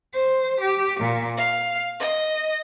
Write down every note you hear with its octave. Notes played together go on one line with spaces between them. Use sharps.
C5
G4
A#2
F5
D#5